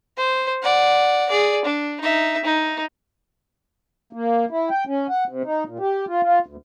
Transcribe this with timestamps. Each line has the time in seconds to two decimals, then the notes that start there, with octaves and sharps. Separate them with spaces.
0.17 C5
0.62 D5 F#5
1.30 G#4 D5
1.65 D4
2.01 D#4 E5
2.45 D#4
4.13 A#3
4.51 E4
4.71 G5
4.87 C#4
5.09 F#5
5.29 C3
5.45 D#4
5.66 A#2
5.80 G4
6.08 F4
6.23 F4
6.46 D2